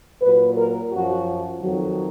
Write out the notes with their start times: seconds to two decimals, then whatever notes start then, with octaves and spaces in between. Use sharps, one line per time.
0.22 A#2 F#3 B4
0.56 A#4
0.91 F#2 F3 F#4
1.60 F2 D#3 F#3